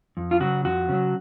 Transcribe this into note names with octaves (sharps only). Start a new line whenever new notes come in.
F2
F4
C#3 F#3 F#4
F2 F#4
C#3 F#3